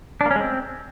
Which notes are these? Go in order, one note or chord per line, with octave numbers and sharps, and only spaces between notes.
D4
A#3
C#4
G#3
C4